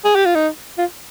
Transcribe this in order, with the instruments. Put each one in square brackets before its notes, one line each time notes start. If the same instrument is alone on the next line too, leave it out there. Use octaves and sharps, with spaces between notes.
[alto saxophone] G#4
G4
F4
D#4
F4